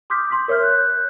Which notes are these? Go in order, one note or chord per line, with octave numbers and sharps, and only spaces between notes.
C6 D6 D#6 F6 G6 B6
C6 B6
A#4 C#5 E5 F6 G6
F#6